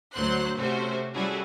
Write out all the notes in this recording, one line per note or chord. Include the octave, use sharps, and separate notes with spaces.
D2 F#3 C5 C6 F#6
C3 A3 C#4 F#4 C5
G3 C#4 E4 F#4 G#4 A4